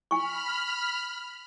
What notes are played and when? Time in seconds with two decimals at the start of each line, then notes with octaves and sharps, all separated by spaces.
0.11 G#5 B5 C#6 F6